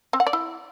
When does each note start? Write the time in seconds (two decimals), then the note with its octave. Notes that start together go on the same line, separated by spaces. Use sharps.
0.13 C4
0.20 F#5
0.27 D5
0.33 E4